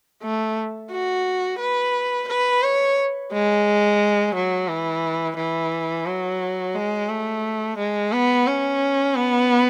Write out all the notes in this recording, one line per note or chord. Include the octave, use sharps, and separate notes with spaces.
A3
F#4
B4
B4
C#5
G#3
F#3
E3
E3
F#3
G#3
A3
G#3
B3
C#4
B3